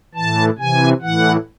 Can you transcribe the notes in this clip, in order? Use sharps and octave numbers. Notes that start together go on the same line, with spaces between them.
A2 E3 A5
C3 E3 G#5
A2 E3 F#5